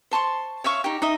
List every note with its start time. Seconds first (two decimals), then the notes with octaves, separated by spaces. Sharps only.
0.11 C5 A5 C6 C#6
0.64 C#5 E5 F5 C#6
0.84 D#4 G4
1.02 D#4 D#5 E5